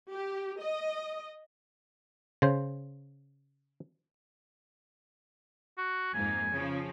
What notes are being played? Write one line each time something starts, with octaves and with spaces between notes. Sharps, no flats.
G4
D#5
C#3 C5
F#4
F2 G#2 A#3 G#5
C#3 F3